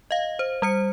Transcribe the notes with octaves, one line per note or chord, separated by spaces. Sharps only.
D#5 F5
C5
G3 C5 C#7